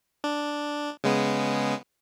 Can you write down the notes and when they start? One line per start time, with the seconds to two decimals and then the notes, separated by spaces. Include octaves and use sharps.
0.24 D4
1.04 C#3 G#3 B3